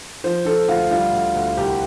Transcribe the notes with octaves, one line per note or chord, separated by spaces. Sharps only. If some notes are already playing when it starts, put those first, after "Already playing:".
F3 C5
F3 A4
D2 F4
G3 F4
D2
D2
C2 G4